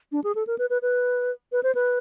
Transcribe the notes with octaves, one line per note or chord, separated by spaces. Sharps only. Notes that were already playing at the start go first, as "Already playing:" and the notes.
D4
G#4
A4
A#4
B4
B4
B4
B4
C5
B4